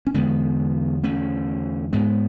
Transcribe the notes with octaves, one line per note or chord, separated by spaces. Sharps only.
C#4
E2 D3 G#3 B3
A3 C#4
G#2 G#3 B3